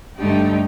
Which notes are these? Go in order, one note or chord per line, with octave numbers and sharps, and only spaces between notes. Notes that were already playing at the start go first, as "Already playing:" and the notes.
G2 D3 A3 D#4 G4